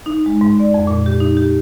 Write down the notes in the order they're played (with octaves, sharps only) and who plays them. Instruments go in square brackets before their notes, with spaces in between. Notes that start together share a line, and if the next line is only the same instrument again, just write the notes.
[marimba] D#4
G#3
G#2
D5
F2
A#2
G4
D#4
G4